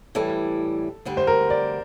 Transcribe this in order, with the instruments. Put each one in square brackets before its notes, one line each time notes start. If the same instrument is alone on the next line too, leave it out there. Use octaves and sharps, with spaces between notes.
[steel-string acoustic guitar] A2 E3 G3 [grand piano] A4
[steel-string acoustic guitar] D2 D3 G3
[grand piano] C5
A#4
D5